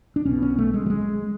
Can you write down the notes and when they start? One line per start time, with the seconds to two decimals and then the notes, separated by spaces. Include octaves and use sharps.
0.16 D4
0.25 B1 B2 C#4
0.42 C#4
0.58 A3
0.74 G#3
0.86 F#3
0.90 G#3